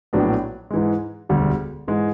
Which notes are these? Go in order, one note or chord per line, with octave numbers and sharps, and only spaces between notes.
A#1 A2 F#3 B3 D4
G#2 E3 G#3
E1 D2 D3 G3
G#2 E3 G#3